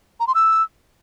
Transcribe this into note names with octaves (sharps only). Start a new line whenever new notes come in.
A#5
C6
E6